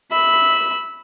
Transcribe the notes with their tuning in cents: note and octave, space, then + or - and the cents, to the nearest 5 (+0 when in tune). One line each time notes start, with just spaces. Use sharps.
E5 -15 B5 +0